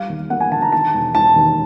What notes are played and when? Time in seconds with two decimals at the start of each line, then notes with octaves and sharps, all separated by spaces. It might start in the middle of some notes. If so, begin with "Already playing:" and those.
Already playing: G3 F5
0.09 D#2
0.30 A#3 F#5
0.40 G#5
0.51 D3 A5
0.62 A#5
0.72 D#3 A5
0.94 E1
1.15 E1 A5
1.36 D#2